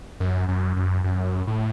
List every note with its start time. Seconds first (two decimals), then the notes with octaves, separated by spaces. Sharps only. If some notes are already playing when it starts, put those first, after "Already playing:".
0.20 F#2
0.48 F#2
0.76 F#2
1.04 F#2
1.47 A2